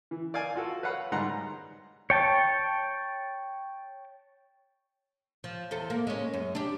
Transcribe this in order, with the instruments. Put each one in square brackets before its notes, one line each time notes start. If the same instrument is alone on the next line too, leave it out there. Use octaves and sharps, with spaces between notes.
[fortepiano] E3
D5 F5 G#5
F4 F#4 A4
B4 C#5 F5 F#5 B5
G#2 D#3 G3 F#5 A#5 C6
[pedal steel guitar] C#5 G5 A5
[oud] F3
E2 A4 C5
A#3
G#3 C#4
F#2
D4 G4